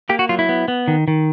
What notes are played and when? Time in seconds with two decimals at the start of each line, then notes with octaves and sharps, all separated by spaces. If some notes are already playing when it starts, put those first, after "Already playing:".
0.09 A#3 G4
0.19 F#4
0.29 F#3 F4
0.39 E4
0.49 B3
0.68 B3
0.88 D#3
1.08 D#3